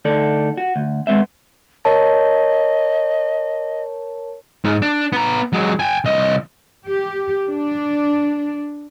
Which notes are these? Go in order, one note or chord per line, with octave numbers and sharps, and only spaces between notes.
D2 D#4 A4 D5
F#4
D2
G#3 A3 B3 C4 E5
A#4 C#5 D#5 A5
G#2
D4
B3 A#5
F#3 G#3
G5 G#5
C2 D#5
G4
D4